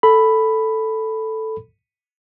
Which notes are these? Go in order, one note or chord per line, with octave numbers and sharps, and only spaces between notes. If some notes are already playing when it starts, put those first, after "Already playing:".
A4 B5